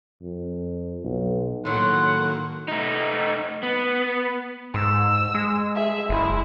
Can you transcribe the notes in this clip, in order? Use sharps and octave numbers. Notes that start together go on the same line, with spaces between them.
F2
B1
A2 D#3 F#3 A#3 F#5 C6
A3 D#4
B3
G#2 E6
G#3
G#4 E5
F#1 G#3 E4